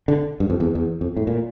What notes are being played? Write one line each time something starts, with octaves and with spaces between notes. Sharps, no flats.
D3
G2
F2
E2
E2
F2
A2
A#2